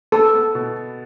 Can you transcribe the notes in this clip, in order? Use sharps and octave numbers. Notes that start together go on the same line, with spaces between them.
B3 A4
B3
B2